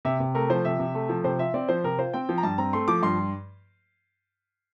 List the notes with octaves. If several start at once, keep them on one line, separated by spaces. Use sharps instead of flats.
C3 E5
C3
A3 A#4
F3 C5
C3 E5
C3
A3
F3
C3 C5
F4 E5
C4 D5
F3 C5
C3 A#4
F4 C5
C4 G5
F3
A#5
G2 A5
C4 A#5
A3 C6
F3 D6
G2 C6